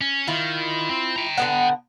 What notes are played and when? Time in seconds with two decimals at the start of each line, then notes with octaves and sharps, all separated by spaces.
0.01 C#4
0.28 D#3 E4 F4
0.90 C4
1.16 G5 A#5
1.37 D3 B3 F#5